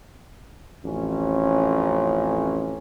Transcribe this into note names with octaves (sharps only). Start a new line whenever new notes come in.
A1 F2 C#4